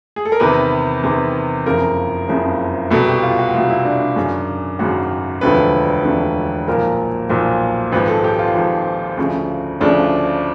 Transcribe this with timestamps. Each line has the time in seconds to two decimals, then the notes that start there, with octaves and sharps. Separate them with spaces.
0.16 G#4
0.25 A4
0.32 A#4
0.40 E2 C3 D#3 B4
1.03 E2 C3 D#3
1.66 F#1 F2 C#3 F3 A#4
2.28 F#1 F2 C#3 F3
2.91 C2 B2 A4
3.07 G4
3.23 F4
3.39 F#4
3.54 C2 B2 F4
3.70 E4
3.85 D4
4.01 D4
4.16 G#1 F#2 C#3
4.79 G#1 F#2 C#3 F#4
5.41 E1 D2 D3 F3 B4
6.04 E1 D2 D3 F3
6.68 B1 A#2 F3 A#4
7.29 B1 A#2 F3
7.92 G#1 G#2 F3 B4
8.08 A4
8.24 G4
8.39 F4
8.55 G#1 G#2 F3
9.17 D2 C#3 F3
9.80 D2 C#3 F3 D4